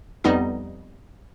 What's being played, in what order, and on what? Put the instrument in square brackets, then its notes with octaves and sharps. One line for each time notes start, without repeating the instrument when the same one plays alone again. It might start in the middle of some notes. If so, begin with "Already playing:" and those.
[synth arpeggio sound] F2 G3 B3 D#4 D#5